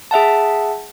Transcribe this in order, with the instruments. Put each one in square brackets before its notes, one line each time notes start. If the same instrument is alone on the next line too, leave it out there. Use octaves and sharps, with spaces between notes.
[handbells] G#4 E5 F#5 A5